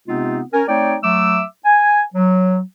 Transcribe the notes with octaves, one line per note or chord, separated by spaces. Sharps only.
C3 G#3 B3 C4 D#4 F4
C#4 A#4 G#5
A3 C4 D#4 C#5 D5 G5
F#3 A3 E5 D6 E6
G#5
F#3